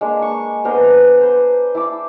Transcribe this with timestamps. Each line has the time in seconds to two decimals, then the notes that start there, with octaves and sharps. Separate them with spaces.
0.01 G#3 A#3 D4
0.22 C#6
0.65 B3 D4 A#4 C5
1.21 B4 C5
1.75 E4 A5 D6